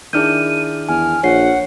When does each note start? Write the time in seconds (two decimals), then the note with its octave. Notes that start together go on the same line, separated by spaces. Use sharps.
0.13 D#3 D4 E4 G#4 F6 G6 D#7
0.89 E2 G#5 F6
1.23 A#1 C#5 F#5 C7